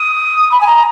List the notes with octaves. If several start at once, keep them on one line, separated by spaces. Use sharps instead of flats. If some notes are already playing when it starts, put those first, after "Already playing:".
Already playing: D#6
B5
G#5
A#5